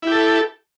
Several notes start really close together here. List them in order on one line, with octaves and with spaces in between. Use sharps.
E4 G4 A4